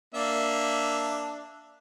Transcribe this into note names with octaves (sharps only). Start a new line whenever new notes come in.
A#3 D4 E5